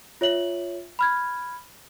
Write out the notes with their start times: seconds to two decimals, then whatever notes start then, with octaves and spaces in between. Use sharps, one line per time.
0.21 F4 C#5 E5 F#7
0.99 B5 F6 G#6